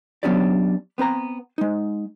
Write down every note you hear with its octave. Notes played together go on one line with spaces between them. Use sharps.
F#3 B3 C#4 D4 G4 D5
B3 C4 B4 A#5
G#3 D#4